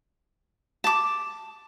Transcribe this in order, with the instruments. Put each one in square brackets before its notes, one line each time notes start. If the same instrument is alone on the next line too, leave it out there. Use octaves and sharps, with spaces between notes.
[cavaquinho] A5 D6